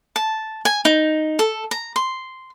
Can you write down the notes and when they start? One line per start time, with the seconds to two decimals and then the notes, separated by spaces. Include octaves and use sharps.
0.16 A5
0.65 G#5
0.85 D#4
1.39 A4
1.71 A#5
1.96 C6